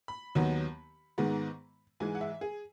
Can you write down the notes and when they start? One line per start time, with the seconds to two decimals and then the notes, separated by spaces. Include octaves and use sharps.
0.08 B5
0.35 D#2 D#3 F#3 B3
1.18 G#2 D#3 G#3 B3
2.00 G#2 E3 G#3 G#5
2.15 F#5
2.21 E5
2.41 G#4